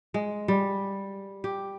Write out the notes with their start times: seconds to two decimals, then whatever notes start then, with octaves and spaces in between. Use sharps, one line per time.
0.14 G#3
0.48 G3
1.44 G4